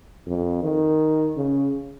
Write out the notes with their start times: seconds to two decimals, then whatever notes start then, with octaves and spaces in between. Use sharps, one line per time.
0.27 F2
0.63 D#3
1.37 C#3